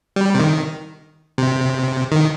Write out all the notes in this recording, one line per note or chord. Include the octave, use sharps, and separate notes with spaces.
G3
C3
D#3
C3
D#3